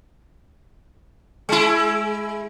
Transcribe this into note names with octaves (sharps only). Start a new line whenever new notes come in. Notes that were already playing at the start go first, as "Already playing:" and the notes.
G#3 E4